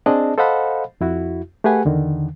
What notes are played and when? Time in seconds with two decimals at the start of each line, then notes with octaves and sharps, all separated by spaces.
0.06 C4 D4 G#4 D5 D#5 A5
0.38 A4 C5 D#5 F5 F#5 B5
1.01 F2 E4 F#4
1.64 A3 G4 G#4 B4 F#5 G#5
1.85 E2 D3 D#3